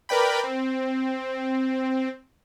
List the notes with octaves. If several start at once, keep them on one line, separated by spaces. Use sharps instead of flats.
A#4 B4 D5 G5 B5
C4